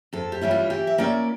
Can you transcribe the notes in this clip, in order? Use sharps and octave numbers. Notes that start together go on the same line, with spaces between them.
F2 A4
G4
E3 G3 C#4 E4
F4
E3 G4
E5
A#3 C#4 E4 D5